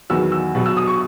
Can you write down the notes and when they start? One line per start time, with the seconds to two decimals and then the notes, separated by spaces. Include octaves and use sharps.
0.10 E2 D#3 F#3 B3 E6
0.32 E6
0.55 B2 F#3 B3
0.66 E6
0.77 D#6
0.87 C#6